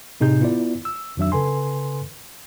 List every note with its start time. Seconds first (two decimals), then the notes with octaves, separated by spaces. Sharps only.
0.20 A2 C3 D#4 G#4 G6
0.41 B3 E4 F4 D5
0.85 E6
1.17 F2 D#3 F#3 D4 E5 E6
1.32 C#3 A4 B4 G#5 C6